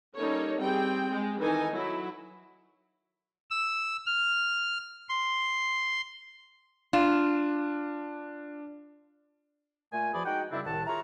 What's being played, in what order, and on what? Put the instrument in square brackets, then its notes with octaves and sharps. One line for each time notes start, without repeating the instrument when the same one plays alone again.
[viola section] G3 A#3 C#4 D#4 A4 C#5
G3 C4 G#4 G5
G#3
D#3 E3 D#4 A4 G#5
F#3 E4
[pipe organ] E6
F6
C6
[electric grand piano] D4 E7 [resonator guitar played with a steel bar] F4
[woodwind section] A#2 A3 F4 G#5
E2 F3 F#4 G#4 D5 B5
G#3 D#4 F#4 F#5 G5
F#2 C#3 G3 C4 D4 E4
C2 A2 D#3 F#5 A5
E4 F4 G#4 A#4 C#5 A#5